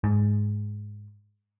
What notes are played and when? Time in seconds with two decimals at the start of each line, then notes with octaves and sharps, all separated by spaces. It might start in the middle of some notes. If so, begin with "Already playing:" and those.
0.04 G#2